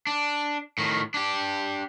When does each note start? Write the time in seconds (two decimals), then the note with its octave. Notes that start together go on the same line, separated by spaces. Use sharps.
0.07 D4
0.78 A2 D#3
1.14 D4 G4